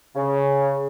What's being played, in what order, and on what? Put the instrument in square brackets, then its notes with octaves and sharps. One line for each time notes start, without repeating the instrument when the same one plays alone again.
[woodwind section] C#3